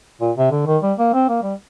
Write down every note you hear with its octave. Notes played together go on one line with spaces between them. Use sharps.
A#2
C3
D3
D#3
G3
A#3
C4
A#3
G3